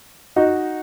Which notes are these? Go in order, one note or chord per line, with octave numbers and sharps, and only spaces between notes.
D#4 F#4